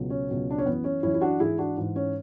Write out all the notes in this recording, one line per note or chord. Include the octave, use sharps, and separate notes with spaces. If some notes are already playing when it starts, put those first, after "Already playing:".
Already playing: C#2 B2 F#3
C#4
C#2 B2 F#3
D4
C#4
F#2 E3 B3
C#4
F#2 E3 C#4 E4
E4
D4 F#4
G#2 E3 E4 G#4
D4 F#4
G#2 E3
C#4